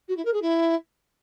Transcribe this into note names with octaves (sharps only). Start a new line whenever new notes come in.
F#4
E4
A#4
G#4
E4